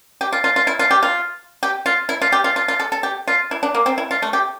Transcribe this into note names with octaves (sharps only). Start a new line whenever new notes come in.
G4
F4
F4
F4
E4
F4
G4
F4
G4
F4
E4
F4
G4
F4
F4
F4
A4
A4
G4
F4
E4
D4
A#3
C4
E4
F4
A3
G4